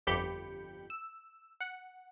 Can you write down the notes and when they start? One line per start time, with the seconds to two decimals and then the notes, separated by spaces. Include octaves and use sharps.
0.07 G1 F2 G4 B5 G6 C#7
0.90 E6
1.60 F#5